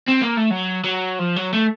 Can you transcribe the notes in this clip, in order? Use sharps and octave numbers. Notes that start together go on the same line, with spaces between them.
C4
A#3
A3
F#3
F#3
F3
F#3
A3